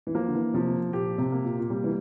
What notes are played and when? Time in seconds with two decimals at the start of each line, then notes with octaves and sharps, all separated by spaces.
0.07 E3
0.15 F3 A#3
0.28 D3
0.35 E3
0.54 C3 F3
0.93 A#2 G4
1.18 C3
1.32 A#3
1.45 A#2
1.59 A#2
1.70 C3 G3
1.84 E3